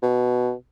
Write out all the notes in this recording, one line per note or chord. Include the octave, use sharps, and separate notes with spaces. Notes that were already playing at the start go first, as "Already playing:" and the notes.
B2